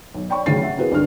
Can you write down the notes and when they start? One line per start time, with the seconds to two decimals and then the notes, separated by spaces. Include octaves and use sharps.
0.15 B1
0.29 C#5 D5 G5 B5 C#6
0.46 A1 C#3 F#3 A6 C7
0.63 E5 F#5
0.78 A#3 C4 E4 F#4 G#4 B4
0.92 C2 G2 D3 D#3 B4 F6